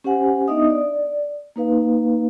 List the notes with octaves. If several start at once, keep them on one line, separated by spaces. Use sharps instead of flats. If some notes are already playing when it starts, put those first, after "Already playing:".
C#4 G4 C5 F#5 G#5
B3 D4 D#4 D#5 E5 D#6
D5
A#3 D#4 B4 F5